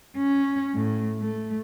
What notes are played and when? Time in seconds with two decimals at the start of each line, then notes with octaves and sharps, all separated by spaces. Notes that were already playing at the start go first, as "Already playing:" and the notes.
0.17 C#4
0.75 A2
1.21 A3